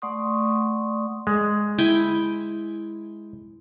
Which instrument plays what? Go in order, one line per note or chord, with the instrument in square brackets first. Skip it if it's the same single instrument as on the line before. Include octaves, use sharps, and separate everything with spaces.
[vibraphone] A3 D5 F#5 C6 C#6 D#6
[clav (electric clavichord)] G#3
[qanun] E4 G5 G#5